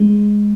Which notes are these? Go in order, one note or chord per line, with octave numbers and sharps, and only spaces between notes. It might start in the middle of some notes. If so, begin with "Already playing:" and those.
Already playing: G#3